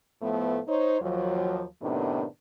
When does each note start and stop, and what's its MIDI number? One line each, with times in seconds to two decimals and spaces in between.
0.22 0.60 45
0.22 0.60 53
0.22 0.60 57
0.22 0.60 59
0.68 1.00 63
0.68 1.00 72
0.68 1.00 73
1.02 1.64 39
1.02 1.64 53
1.02 1.64 54
1.82 2.25 42
1.82 2.25 45
1.82 2.25 48
1.82 2.25 51
1.82 2.25 59
1.82 2.25 62